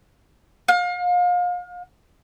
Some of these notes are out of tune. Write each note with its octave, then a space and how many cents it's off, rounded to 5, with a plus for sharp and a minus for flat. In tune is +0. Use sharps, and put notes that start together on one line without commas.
F5 +35